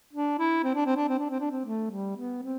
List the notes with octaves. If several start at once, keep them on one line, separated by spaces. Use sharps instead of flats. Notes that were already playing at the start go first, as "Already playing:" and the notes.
D4
E4
C4
D4
C4
D4
C4
D4
C4
D4
C4
A3
G3
B3
C4